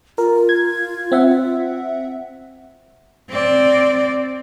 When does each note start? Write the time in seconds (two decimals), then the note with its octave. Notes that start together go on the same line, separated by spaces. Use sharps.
0.18 F4 A#4
0.49 G#6
1.12 C4 E5 F#5
3.30 C4 D5